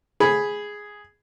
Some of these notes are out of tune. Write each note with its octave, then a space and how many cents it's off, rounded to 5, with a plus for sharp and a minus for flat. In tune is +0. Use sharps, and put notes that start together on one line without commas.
G#4 +0 B5 +0